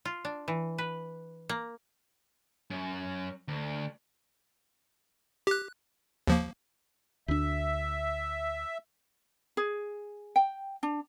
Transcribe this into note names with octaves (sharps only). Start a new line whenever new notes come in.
F4
D4
E3
B4
A#3
F#2
D2
G4 F#6
D#2 F3 A#3
D2 D4 E5
G#4
G5
D4